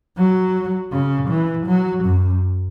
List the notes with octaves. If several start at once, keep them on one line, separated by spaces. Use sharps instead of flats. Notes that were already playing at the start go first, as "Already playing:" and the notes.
F#3
C#3
E3
F#3
F#2